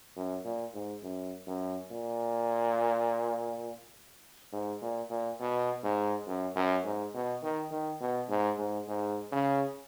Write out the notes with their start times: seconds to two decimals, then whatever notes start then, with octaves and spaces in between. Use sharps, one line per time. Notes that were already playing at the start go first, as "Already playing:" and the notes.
0.16 F#2
0.45 A#2
0.74 G#2
1.03 F#2
1.47 F#2
1.91 A#2
4.53 G#2
4.82 A#2
5.10 A#2
5.40 B2
5.84 G#2
6.27 F#2
6.56 F#2
6.85 G#2
7.14 B2
7.43 D#3
7.71 D#3
8.00 B2
8.30 G#2
8.58 G#2
8.88 G#2
9.32 C#3